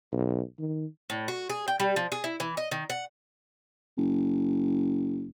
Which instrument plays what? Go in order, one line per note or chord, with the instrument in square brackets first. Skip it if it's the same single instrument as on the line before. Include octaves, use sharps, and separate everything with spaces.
[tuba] B1
D#3
[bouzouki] A2
F#4
G#4
G5
G3
F3
G#4
E4
E3
D#5
D#3
F#5
[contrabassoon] F#1